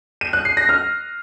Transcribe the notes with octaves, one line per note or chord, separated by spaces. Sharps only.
D#7
F#6
C7
A#6
F6